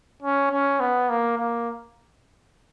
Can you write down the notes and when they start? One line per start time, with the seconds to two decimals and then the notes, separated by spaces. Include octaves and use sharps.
0.23 C#4
0.52 C#4
0.80 B3
1.09 A#3
1.38 A#3